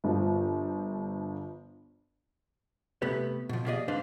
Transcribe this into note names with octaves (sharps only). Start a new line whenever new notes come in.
G1 F3
C3 A3 B3 G4 B4
B2 F3
A#3 G4 G#4 D5 D#5
G#2 C4 D4 B4 F5 C6